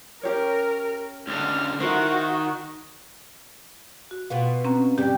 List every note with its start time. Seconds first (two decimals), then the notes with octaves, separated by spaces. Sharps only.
0.23 C#4 G4 A#4 C#5
1.28 C#2 D3 F6
1.80 D#3 E4 F#4 C5
4.11 F#4
4.30 B2 B3 F4
4.65 C4 C#4 A#5
4.98 G2 C#3 G3 G4